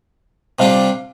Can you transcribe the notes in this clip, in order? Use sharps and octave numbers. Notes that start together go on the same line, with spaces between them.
C3 G3 D4 F4 F5